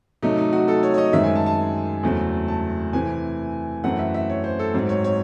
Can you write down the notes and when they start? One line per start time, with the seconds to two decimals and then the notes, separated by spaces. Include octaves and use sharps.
0.22 C3 F#3 A3 D#4
0.38 D#4
0.53 F#4
0.68 A4
0.83 C#5
0.94 C#5
0.98 D#5
1.13 F#2 D#3 G#3 C4 E5
1.24 G#5
1.36 A5
1.46 A5
2.03 E2 C#3 F#3 A3 C4
2.48 A5
2.93 C3 E3 A3 C4 G#5
3.84 F#2 E3 A3 C4 F#5
3.99 E5
4.14 E5
4.30 C#5
4.44 C5
4.59 A4
4.74 G#2 F#3 C4
4.89 C#5
5.04 C#5